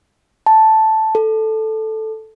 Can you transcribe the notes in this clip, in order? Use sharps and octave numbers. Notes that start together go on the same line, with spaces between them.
A5
A4